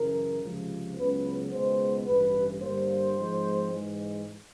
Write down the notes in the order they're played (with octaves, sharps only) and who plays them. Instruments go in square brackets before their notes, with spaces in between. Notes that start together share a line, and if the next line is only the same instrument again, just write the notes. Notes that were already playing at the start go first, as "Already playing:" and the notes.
Already playing: [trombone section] F#2 C#3 E3 A#4
C#2 C3 F3
C#2 C#3 F#3 B3 B4
C#2 B2 G#3 B3 C5
A1 G2 E3 B4
G2 D3 G3 A#3 C5
G#2 F3 G#3 C4
G#2 E3 G#3